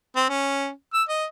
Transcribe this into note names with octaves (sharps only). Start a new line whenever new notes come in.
C4
C#4
E6
D#5